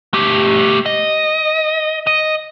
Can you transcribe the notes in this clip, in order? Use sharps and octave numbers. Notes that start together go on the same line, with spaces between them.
A3 G4
D#5
D#5